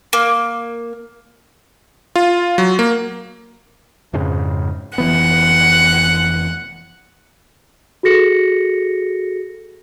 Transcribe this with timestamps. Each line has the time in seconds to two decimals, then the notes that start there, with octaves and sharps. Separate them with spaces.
0.13 A#3
2.16 F4
2.58 F#3
2.79 A#3
4.13 F2 G#2 C#3
4.98 F1 E3 B3 F#5
8.03 F#4 G#4 A4 A#6 C#7